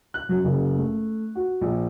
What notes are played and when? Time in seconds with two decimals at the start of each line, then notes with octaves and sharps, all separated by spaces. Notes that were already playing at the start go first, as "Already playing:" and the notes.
0.14 F#6
0.29 F#2
0.44 F#1
0.77 A3
1.35 F#4
1.61 A#1